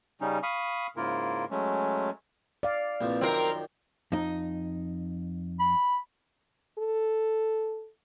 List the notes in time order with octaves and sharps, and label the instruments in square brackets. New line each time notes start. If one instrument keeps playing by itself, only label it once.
[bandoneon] C#3 G3 C#4 D#4
F5 B5 C#6 D#6
G#2 C#3 A#3 E4 F4 A#4
F#3 G#3 A3 C#4
[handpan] D5 F5
[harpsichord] A#1 F2 F3 [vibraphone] C4 E4 B4
[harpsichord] F#2 D#3 F3 [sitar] C4 A#4 [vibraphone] G5 A#5 C6
[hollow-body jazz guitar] F2 D#4
[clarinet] B5
[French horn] A4